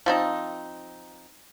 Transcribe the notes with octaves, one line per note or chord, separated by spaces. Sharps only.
F3 C4 D#4